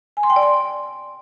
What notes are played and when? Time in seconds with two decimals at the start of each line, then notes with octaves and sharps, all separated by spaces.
0.17 G#5
0.23 C6
0.30 G5
0.36 D5
0.43 C6